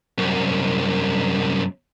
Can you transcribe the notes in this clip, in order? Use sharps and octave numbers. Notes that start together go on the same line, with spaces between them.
C2 F#2